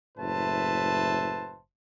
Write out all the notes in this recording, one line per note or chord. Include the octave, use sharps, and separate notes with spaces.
F#1 A2 B4 C5 E5 A5